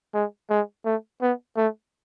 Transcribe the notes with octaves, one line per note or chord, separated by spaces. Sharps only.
G#3
G#3
A3
B3
A3